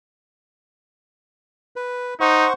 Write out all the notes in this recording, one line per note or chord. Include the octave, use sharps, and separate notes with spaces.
B4
D#4 C5 F#5 C#6